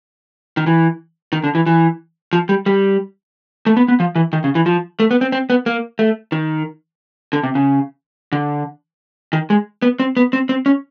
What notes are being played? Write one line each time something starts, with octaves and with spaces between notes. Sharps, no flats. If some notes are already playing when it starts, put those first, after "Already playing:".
D#3
E3
D#3
D3
E3
E3
F3
G3
G3
A3
B3
B3
F3
E3
D#3
C#3
E3
F3
A3
B3
C4
C4
B3
A#3
A3
D#3
D3
C3
C#3
D3
D#3
G#3
B3
C4
B3
C4
C4
C#4